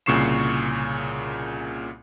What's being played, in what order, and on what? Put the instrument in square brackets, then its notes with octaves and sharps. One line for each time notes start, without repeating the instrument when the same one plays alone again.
[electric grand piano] C2 A#2 C#3 C#6 C7 E7